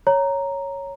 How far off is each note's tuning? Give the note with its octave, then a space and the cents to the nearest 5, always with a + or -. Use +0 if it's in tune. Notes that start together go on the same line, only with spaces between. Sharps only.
C#5 +0 A#5 +0